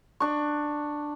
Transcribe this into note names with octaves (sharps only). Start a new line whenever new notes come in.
D4 C#6